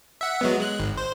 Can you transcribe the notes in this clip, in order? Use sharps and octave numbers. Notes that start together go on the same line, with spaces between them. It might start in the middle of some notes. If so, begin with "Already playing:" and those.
E5 F#5
F#3 G#3 B3
G#3 F#6
G#1
C5